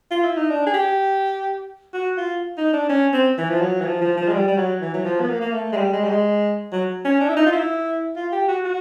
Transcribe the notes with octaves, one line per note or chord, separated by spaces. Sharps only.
F4
E4
D#4
D4
G#4
G4
F#4
F4
D#4
D4
C#4
C4
E3
F3
F#3
E3
F3
F3
F3
G#3
G3
G3
F#3
E3
F#3
F3
B3
A#3
A#3
A3
G#3
G3
G#3
G3
G#3
F#3
C#4
D4
E4
D#4
F4
E4
F4
G4
F#4
F#4